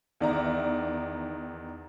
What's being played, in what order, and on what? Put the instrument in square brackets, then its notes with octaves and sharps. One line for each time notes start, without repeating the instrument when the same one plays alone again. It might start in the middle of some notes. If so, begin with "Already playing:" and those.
[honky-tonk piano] E2 D#3 D5 E5 A#5